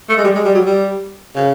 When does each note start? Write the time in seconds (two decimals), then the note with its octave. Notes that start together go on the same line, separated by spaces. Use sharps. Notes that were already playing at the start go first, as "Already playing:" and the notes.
0.09 A3
0.18 G#3
0.24 G3
0.35 G#3
0.45 G3
0.55 F#3
0.66 G3
1.36 C#3